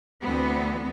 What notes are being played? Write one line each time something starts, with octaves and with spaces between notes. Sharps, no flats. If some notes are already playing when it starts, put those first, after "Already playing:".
D2 E3 B3 C4